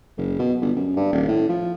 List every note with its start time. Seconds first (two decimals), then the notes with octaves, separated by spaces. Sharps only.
0.17 F#1
0.39 B2
0.61 G1
0.76 F#2
0.96 G2
1.12 D#1
1.28 A2
1.49 F3